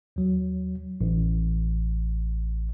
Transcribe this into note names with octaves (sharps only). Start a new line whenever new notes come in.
D#2 F#3
A1